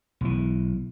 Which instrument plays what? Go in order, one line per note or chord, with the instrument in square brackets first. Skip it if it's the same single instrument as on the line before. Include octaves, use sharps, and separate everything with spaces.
[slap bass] B1 E3